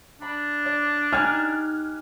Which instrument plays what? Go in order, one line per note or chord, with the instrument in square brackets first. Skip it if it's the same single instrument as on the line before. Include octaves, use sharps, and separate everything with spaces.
[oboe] D4 [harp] B5
[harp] D5
[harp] D#4 G4 G#5 [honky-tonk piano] F6 F#6 G#6